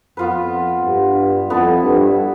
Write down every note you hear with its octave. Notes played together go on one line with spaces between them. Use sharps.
F2 B3 F4 B4
G2
F2 B3 E4 A4
G2